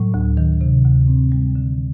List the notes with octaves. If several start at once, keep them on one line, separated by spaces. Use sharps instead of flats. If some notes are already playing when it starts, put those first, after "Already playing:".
Already playing: A2 F#3
D2
D#3
C3
D2
C4
G3
D3